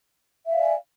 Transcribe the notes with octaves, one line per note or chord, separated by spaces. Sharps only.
D5 E5 F5 G#5